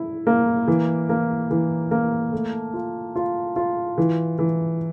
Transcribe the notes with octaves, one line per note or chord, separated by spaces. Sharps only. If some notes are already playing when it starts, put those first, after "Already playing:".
Already playing: E4
A#3
E3
A#3
E3
A#3
A3
F4
F4
F4
E3
E3